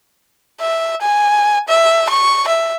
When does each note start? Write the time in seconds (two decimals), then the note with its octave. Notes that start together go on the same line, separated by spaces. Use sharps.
0.60 E5
1.01 G#5
1.68 E5
2.09 C#6
2.47 E5